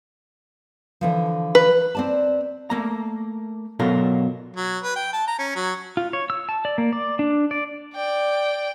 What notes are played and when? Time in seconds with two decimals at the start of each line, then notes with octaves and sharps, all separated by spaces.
1.01 D3 E3 F3
1.55 B4
1.95 C4 D5 A5
2.70 A3 A#3 A#5
3.79 B2 F#3 F4 A4 A#4
4.56 F#3
4.84 B4
4.96 G5
5.13 A5
5.27 A#5
5.39 C#4
5.56 F#3
5.97 F4
6.13 C#5
6.30 E6
6.49 A5
6.65 D5
6.78 A#3
6.93 D5
7.19 D4
7.51 D5
7.94 D5 G5